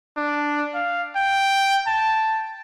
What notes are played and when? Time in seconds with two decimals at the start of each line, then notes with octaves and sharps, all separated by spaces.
0.17 D4
0.75 F5
1.16 G5
1.87 A5